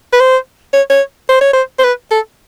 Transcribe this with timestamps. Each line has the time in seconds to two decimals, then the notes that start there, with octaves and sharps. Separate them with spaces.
0.13 B4
0.20 C5
0.73 C#5
0.90 C#5
1.29 C5
1.41 C#5
1.53 C5
1.79 C5
1.84 B4
2.11 A4